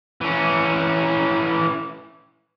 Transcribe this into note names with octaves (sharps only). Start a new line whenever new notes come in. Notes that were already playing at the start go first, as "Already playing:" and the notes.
E3 C#4